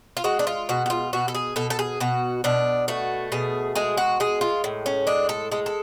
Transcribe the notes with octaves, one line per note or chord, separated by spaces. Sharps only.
F4
G#3 F#4
D4
F4
B2 F#4
F#4
F4
B2 F#4
A4
G#4
B2 A4
A4
G#4
B2 F#4
B2 D4
A3 F#4
B2 G#4
G#3 G#4
F#4
G#3 G#4
F4
A2
C#4
G#3 D4
A4
G#3 A4
A4